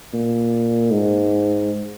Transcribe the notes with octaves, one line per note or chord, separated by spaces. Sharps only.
A#2
G#2